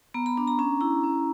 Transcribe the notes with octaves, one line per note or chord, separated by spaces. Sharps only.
B3 A#5
B5
D4 B5
A#5
C#4 A#5
E4 A#5
C#4